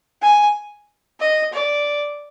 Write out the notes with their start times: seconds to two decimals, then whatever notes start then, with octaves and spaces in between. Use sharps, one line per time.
0.22 G#5
1.20 D#5
1.53 D5